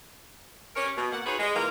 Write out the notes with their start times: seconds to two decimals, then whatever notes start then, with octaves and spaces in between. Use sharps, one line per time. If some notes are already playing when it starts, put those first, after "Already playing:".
0.76 C#4 G4 A#4 C#5
0.96 B2
1.11 A#3 F#5
1.25 D#4 F4 F#4 G#4 B4 C#5
1.39 G#3
1.56 E3 A#3 F4 A#4